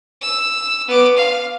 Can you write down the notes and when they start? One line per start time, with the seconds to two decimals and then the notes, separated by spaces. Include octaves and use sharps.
0.21 E6
0.88 B3 D6
1.16 F5